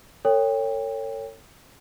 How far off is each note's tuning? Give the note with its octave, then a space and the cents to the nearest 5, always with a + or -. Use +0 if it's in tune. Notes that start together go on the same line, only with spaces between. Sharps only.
A4 +45 C#5 +0 G5 +25